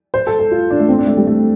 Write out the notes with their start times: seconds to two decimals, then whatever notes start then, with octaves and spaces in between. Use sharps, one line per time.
0.14 C5
0.27 A4
0.39 A4
0.51 F4
0.71 D4
0.80 A3
0.89 C4
0.99 D4
1.07 A3
1.17 G3
1.27 A3